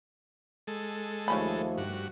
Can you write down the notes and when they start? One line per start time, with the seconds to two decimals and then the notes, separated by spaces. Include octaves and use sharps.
0.67 G#3 A4
1.28 D#2 C#3 F3 A3 C#4 B5
1.78 G2 F#4